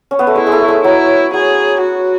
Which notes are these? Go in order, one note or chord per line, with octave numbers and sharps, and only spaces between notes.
C#4
B3
A3
G#3 E4
G#3
A3
G#3
F#3 E4
F#3 G#4
F#4